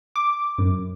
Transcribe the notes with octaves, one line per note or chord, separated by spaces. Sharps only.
D6
F#2